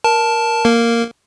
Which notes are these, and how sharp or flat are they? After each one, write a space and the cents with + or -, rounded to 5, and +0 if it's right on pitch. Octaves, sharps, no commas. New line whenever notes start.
A#4 +10 A5 +0
A#3 +0 A#4 -10